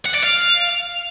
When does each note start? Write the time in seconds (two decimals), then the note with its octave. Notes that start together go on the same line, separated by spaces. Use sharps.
0.06 F#5
0.15 D5
0.24 F5